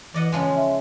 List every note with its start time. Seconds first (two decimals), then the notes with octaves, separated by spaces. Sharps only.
0.14 E3 D5 D#5 F#5
0.32 C#3 F3 G#3
0.56 E5